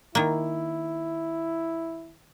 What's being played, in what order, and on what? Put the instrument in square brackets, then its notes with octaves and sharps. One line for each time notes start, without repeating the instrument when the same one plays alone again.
[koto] D#3 A#3 [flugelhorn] E4